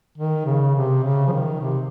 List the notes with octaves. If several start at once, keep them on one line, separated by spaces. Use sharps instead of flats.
D#3
C#3
C3
C#3
F3
D#3
C3